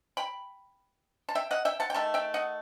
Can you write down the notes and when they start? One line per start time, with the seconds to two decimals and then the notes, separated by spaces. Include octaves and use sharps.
0.17 G5 B5
1.29 A5
1.35 E5 G5
1.51 D#5 F#5
1.65 E5 G5
1.80 F#5 A5
1.90 G5
1.94 D#3 A3 A5
2.14 E5 G5
2.34 D#5 F#5